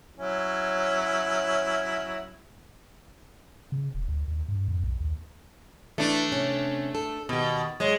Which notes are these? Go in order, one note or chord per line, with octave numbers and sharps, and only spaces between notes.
F#3 C#4 E4
C#3
D#1
D2
D#2
G2
F2
B1
D#2
E3 A3 D4
C3 C#4
A4
B2 D#3 G4
F#3 G#3 C#5 D#5